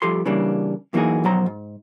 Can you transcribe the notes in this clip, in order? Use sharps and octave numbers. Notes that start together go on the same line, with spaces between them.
F3 G3 G4 A4 C6
C#3 E3 G3 A#3 D4
F#2 E3 A#3 D#4 F#4 G#4
B1 F2 F#3 C5 A#5
G#2